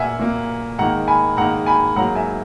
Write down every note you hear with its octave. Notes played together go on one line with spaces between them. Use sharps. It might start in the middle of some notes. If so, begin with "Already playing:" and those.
Already playing: A#2 A#3 E5 F#5 G#5
A#2 A#3
G#2 D#3 A#3 F#5 A#5
G#5 B5
G#2 D#3 A#3 F#5 A#5
G#5 B5
G#2 F#3 A#3 F#5 A#5
E5 G#5